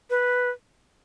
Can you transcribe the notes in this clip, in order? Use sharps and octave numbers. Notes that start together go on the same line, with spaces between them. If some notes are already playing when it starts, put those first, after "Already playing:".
B4